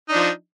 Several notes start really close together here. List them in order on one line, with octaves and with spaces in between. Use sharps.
D#4 D4 F3